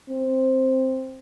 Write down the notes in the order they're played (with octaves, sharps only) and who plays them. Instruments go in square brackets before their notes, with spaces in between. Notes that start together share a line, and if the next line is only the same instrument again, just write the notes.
[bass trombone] C4